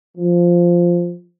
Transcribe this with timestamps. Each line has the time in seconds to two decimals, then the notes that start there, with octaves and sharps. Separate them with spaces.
0.17 F3